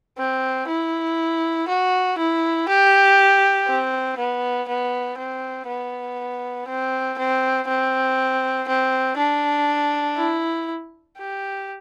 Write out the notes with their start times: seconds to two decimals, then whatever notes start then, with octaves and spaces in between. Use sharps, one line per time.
0.18 C4
0.68 E4
1.68 F#4
2.18 E4
2.68 G4
3.68 C4
4.18 B3
4.68 B3
5.18 C4
5.67 B3
6.68 C4
7.19 C4
7.68 C4
8.68 C4
9.18 D4
10.17 E4
11.18 G4